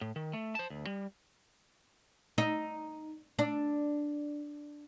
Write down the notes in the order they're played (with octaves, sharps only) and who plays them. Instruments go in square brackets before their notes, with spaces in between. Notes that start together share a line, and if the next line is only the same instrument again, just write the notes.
[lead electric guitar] A2
D#3
A3
C5 A5
D2
G3
[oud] D#4
D4